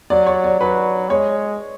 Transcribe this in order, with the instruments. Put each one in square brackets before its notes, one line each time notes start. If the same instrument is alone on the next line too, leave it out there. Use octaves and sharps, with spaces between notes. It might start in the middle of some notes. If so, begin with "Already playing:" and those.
[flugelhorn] F#3 [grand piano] D5
[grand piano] C#5
D5
[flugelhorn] F#3 [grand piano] B4
[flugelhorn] G#3 [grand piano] C#5